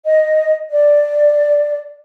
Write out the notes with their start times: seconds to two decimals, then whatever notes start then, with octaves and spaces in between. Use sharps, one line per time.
0.06 D#5
0.72 D5